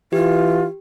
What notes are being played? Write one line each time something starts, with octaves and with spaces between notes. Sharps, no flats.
E3 F4 G4